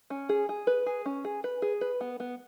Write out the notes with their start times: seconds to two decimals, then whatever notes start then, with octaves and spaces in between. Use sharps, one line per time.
0.10 C#4
0.29 G#4
0.49 G#4
0.67 B4
0.86 G#4
1.06 C#4
1.25 G#4
1.44 B4
1.62 G#4
1.81 B4
2.01 B3
2.20 B3